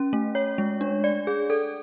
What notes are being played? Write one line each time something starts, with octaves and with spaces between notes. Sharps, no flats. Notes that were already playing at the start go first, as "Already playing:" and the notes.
Already playing: C#4
A3
C#5
G#3
D4
D5
G#4
A4